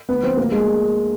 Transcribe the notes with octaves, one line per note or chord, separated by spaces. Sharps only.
D2 B3 B4
F3 C4 C5
D2 A#3 A#4
D2 G#3 G#4